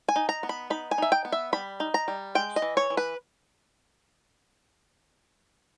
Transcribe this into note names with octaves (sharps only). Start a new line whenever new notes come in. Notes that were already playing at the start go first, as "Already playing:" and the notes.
G#5
D#4
A#5
B3
B5
D#4 B5
G#5
D#4 E5
G5
B3
E5
G3 B5
D#4
A#5
G3
G#3 G5
D#5
E3
C#5
E3
B4